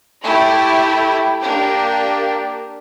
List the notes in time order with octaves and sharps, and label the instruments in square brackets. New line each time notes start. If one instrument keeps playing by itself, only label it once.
[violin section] A3 E4 G4
A#3 D4 G4 A#4